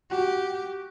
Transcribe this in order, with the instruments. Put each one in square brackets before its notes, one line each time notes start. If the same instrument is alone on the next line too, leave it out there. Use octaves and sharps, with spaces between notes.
[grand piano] F#4 [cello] G4